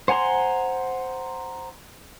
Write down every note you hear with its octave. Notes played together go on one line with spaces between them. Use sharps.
C5 F#5 G#5 A#5 C6